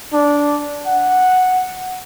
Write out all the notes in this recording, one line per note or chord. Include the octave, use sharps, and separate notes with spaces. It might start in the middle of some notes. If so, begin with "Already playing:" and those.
D4
F#5